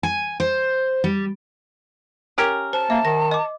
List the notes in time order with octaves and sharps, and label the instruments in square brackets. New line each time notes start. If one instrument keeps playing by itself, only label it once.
[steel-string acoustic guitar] G#5
C5
G3
[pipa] C#4 G4 A#4
[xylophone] C5 [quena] A5
[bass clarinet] A#3 [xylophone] E5
[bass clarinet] D#3 [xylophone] A#6
[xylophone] D#5 D6